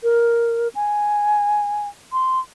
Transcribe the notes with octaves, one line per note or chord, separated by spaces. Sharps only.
A#4
G#5
C6